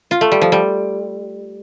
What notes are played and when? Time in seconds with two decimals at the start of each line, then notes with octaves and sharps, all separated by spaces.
0.11 F4
0.21 A3
0.32 G3
0.42 F3
0.52 G3